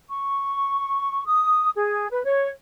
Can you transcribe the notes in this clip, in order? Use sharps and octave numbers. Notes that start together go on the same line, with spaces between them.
C#6
D#6
G#4
B4
C#5